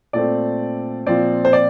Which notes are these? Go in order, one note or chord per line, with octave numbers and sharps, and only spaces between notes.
A#2 A3 C4 D5
A#2 F3 C4 D5
C5
D5